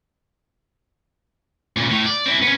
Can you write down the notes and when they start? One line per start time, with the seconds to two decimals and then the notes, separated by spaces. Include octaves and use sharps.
1.77 A#2 C#3
1.90 A2
2.06 D5
2.26 C4 E4
2.42 B3 C#4